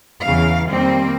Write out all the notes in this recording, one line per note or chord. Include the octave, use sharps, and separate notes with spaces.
E2 C#3 F5
F2 D#3 G3 A#3 C4